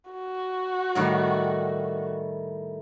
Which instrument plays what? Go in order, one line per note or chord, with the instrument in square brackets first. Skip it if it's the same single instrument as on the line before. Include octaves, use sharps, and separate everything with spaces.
[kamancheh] F#4
[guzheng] A2 D#3 G3